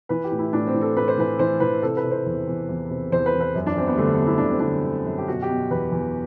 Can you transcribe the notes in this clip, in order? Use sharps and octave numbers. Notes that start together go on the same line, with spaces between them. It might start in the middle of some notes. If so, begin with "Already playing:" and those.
E3 B4
G4
A2
E4
A2 D4
C4
E3
A4
A2 B4
C5
E3 B4
E3 C5
E3 B4
C3 A4
B4
C3
C5
E2
E2
E2
C3
E2 C5
B4
E2
B4
F#2
D4
F#2 C4
B3
G3
D3 A3
B3
F#2
E4
D3 D4
C4
D3 D4
D3
F#2
G4
B2 F#4
G4
B2
E2 B4
E2